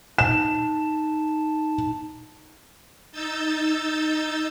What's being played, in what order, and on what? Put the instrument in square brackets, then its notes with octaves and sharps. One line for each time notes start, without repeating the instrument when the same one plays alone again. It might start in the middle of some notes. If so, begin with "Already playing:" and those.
[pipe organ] D#4 A5 [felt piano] E7
[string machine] D#4 E6 G6 A6